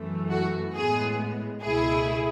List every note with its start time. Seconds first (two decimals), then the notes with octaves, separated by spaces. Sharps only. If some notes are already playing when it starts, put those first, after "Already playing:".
Already playing: F#2 E3 A3
0.31 F#4
0.75 A2 G#3 B3 G#4
1.62 C#2 B2 A3 E4 G#4